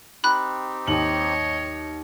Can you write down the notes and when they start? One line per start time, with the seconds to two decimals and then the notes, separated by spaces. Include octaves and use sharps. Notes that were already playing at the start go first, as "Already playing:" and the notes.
0.24 C4 D#4 G4 B5 F#6
0.87 D#2 C#5 D#5 F#7